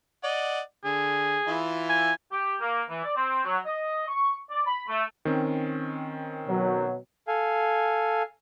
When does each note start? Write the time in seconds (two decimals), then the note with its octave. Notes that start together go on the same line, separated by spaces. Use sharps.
0.24 D5 D#5 F#5
0.85 D3 G#4
1.47 E3 E4 F4
1.89 G#5
2.32 G4
2.61 A#3
2.90 E3
3.04 D5
3.16 C4
3.44 F#3
3.66 D#5
4.08 C#6
4.51 D5
4.67 B5
4.88 A3
5.25 D#3 C4 C#4
6.47 B2 F#3
7.28 A4 F5 G#5